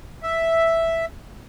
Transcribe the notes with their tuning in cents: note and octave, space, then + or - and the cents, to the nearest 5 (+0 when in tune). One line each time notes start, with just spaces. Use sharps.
E5 +0